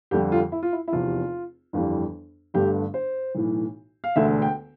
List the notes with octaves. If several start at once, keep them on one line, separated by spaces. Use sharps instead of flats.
F2 D3 G3 G4
F4
E4
F4
E4
E4
F1 E2 C3 F4
G1 F2 E3 G3
G1 G2 D3 A3 G4
C5
B1 A2 E3
F5
E1 D2 D3 A3 E5
G5